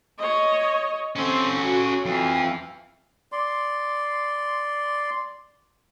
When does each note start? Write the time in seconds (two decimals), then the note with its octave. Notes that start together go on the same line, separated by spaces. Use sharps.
0.18 C#5 D#5
1.16 C4 C#4 A4
1.57 F#4
2.05 F2 E3 F5
3.32 D5 C6